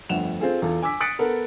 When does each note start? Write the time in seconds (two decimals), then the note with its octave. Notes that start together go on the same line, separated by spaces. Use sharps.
0.09 G1 F2 A3 F#5 E7 F7
0.40 C4 F4 G#4 A4
0.62 E2 F4 A4
0.82 G#5 D6 E6 B6
1.01 D#6 F#6 A6 B6 C#7 D7
1.19 B3 A4 A#4